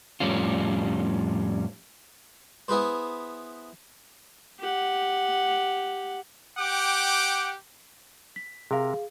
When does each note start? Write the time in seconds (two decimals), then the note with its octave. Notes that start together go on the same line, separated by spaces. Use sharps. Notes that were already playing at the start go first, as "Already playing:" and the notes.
0.20 F2 A2 G3 C#4 F4
2.68 B3 E4 G#4 B4 C5
4.60 G4 F#5
6.58 G4 F#5 G5 D6
8.36 B6
8.71 C3 G#4 A#4 F5